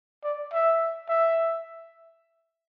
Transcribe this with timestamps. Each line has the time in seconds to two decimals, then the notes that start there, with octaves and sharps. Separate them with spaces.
0.24 D5
0.53 E5
1.09 E5